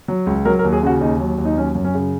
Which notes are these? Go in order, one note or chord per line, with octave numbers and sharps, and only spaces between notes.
F#3
C#2
F#3 A#4
A#4
D#2
G#4
C#3 F#4
D#2 D#4
F#3
D#2
D#4
F#3 C#4
F#2
C#4
C#3